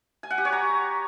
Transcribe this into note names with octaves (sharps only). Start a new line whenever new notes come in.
G#5
F#5
G4
C#5
A#5